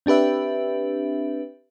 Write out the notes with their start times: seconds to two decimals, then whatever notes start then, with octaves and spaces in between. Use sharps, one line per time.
0.06 C4 D4 G4 B4 E5